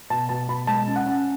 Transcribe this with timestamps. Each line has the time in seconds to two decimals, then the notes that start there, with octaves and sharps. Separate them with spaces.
0.10 B2 A5
0.29 B2 A5
0.48 B2 B5
0.67 G#3 A5
0.86 C#4
0.96 F#5
1.06 C#4